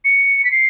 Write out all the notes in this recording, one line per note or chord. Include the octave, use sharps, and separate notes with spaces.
C#7
B6
C7